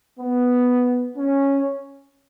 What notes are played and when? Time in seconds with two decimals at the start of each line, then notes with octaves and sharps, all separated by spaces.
0.20 B3
1.17 C#4